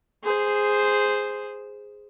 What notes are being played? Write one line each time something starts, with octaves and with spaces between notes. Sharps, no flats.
G#4 C5